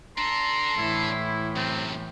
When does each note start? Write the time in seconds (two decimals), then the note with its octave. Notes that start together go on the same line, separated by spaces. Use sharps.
0.18 D4 A4 A#5 C6
0.77 A2 E3 E4
1.56 F#2 C3 C4